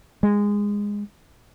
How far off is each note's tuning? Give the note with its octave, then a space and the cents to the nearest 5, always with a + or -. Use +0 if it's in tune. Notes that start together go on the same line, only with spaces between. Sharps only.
G#3 -15